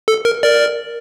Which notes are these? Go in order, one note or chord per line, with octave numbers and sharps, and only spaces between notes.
A4
A#4
A#4 D5